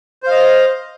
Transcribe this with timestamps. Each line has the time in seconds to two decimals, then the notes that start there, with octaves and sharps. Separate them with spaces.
0.23 C5
0.27 F5
0.31 D#5